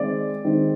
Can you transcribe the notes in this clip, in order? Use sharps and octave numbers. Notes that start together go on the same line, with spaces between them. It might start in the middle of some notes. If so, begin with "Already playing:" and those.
Already playing: D#3 G#3 C4 D5
D#3 G#3 C4